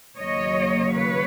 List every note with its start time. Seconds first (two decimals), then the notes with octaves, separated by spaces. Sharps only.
0.16 D#2 C#3 F#3 A#3 C#5 D#5
0.93 B4 C#5